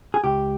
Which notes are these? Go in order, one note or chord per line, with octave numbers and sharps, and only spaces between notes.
G#4
C#2 G4